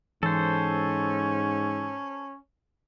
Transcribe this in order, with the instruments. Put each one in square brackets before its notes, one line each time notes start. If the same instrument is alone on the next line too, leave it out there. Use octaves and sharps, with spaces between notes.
[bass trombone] G#2 [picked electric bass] E3 [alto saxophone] C#4 [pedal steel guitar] A4 C5